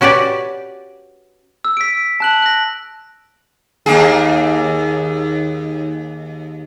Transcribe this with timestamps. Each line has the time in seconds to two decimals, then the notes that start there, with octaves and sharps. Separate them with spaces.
0.01 C#4 F#4 G4 B4 D5
1.65 E6
1.77 B6 D7
2.20 A5 F#6 F#7
2.43 F#6 A#6
3.86 D#2 A#3 G#4